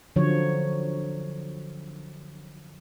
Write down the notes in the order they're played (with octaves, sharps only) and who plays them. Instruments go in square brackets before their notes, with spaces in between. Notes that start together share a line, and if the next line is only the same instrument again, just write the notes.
[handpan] D3 F3 F#3 C#5